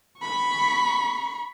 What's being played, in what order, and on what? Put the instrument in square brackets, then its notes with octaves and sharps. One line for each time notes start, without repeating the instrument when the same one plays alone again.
[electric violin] B5 C#6